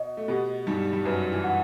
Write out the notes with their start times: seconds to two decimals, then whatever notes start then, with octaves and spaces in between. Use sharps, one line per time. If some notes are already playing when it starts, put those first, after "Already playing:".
Already playing: B2 D#5
0.17 A3
0.28 B2 B3 G4
0.67 G2 G3 D#4
0.93 G3
1.05 F#2 F#3 B4
1.32 E3
1.44 F#5